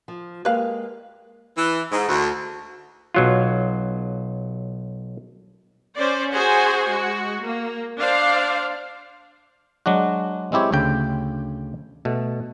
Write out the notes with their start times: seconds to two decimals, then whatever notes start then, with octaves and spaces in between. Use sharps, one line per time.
0.08 F3
0.45 G#3 A#3 G4 B4 F5
1.57 E3
1.92 G#2
2.09 D2
3.14 B1 F#3 F4
5.96 C#4 C5 D5
6.32 F#4 G#4 C5 G#5
6.89 G#3 F#4
7.42 A#3
7.99 D4 C5 D5 F5
9.86 F#3 G#3 D4 F#4
10.52 G#3 C4 E4 G4 C#5
10.72 D2 C#3 G5
12.05 B2 A3